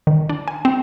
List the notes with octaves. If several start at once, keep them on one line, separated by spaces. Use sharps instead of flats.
D#3
D4
G#5
C4